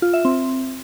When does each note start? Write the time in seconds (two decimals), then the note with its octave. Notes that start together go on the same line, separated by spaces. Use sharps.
0.02 F4
0.14 E5
0.25 C4